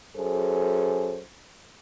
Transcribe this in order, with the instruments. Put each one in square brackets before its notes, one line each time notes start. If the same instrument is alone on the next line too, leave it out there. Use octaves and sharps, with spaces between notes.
[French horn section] F#2 G#4 A4 C5